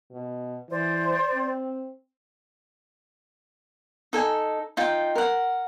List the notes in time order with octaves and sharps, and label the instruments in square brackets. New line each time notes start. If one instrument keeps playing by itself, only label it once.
[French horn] B2
[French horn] E3 [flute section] C5 D5
[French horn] C4
[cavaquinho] D#4 A4 G#5
D#4 F4 G5
A#4 F#5